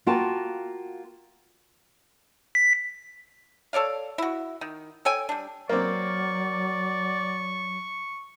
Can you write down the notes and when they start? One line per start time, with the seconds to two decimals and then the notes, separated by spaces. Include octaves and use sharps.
0.06 A#3 F4 F#4 G5 A5
2.55 B6
3.73 A4 C#5 D5 F5
4.18 E4 F#4
4.61 D#3
5.05 A4 C#5 G5 G#5
5.29 G3 D4
5.69 F#3 A#3 C4 D5 C#6